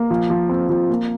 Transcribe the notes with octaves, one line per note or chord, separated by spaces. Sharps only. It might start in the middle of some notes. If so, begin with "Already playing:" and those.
Already playing: A#3
F3
F3
C4
F3
A#3